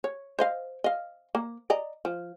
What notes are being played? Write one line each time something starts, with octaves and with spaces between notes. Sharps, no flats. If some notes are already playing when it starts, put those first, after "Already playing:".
C#5
C5 D#5 F5
D#5 F5
A#3
D5 D#5 A#5
F3